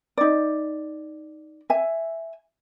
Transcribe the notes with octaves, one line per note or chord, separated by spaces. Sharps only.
D#4 D5
E5 G#5